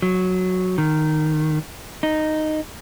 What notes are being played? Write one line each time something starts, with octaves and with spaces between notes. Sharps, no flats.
F#3
D#3
D#4